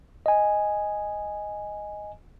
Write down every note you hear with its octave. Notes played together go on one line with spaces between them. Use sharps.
D#5 G#5